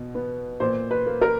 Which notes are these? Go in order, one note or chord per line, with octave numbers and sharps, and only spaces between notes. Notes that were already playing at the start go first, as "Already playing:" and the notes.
Already playing: B2
B3
A#2 C5
B4
A#3
A#4